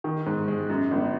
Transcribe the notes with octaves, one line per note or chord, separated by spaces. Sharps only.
D#3
G#2
G#3
F#2
G1